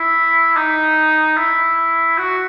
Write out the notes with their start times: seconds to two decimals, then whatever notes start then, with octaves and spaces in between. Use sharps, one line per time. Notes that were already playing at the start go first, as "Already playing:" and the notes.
Already playing: E4
0.56 D#4
1.37 E4
2.18 F#4